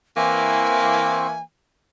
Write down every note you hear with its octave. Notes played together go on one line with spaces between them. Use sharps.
E3 A#3 C4 G#5 C#6